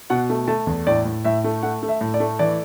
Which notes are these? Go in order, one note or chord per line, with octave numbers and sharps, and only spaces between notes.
B2 F#5
A3
A3 A5
E2
A2 D5
A2
A2 E5
A3
A3 F#5
A3
E5
A2
D5
A3
E3 D5